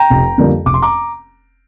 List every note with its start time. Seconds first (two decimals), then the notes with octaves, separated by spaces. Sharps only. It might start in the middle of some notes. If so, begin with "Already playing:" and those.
Already playing: G5 A#5
0.10 F1
0.38 F2 D3 G3 A#3
0.66 F1 D6
0.74 C6
0.82 A#5 D6